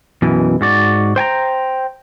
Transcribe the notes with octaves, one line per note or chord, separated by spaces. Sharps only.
F#2 B2 E3
G#2 F#4 D5
C5 G5 G#5 A#5